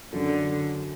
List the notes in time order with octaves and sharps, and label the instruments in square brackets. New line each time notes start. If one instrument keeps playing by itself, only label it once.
[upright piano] F#2 [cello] D3